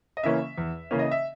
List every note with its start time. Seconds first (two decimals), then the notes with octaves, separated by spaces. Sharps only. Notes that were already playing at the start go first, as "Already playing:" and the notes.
0.17 D#5
0.23 C#3 E3 A#3 C#4 E5
0.58 E2
0.91 C#3 E3 A#3 C#4
0.99 D#5
1.11 E5